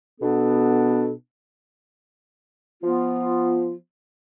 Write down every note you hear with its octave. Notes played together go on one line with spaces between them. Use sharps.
B2 B3 D4 A4
F3 B3 F4